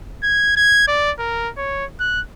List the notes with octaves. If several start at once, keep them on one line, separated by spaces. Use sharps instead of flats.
G#6
G#6
D5
A#4
C#5
F#6